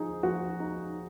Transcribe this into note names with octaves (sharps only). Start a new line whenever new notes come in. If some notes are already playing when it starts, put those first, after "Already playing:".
Already playing: F3 D#4 G#4
F3 F#4
D#4